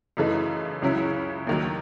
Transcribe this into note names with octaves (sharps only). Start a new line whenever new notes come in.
F#2 C#3 E3 A3 D#4
C#2 C#3 F#3 C#4 E4
D#2 D#3 F#3